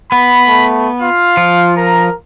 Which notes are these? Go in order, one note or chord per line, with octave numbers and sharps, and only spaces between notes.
B3 B5
A3
F4 F5
F3
A#4 A#5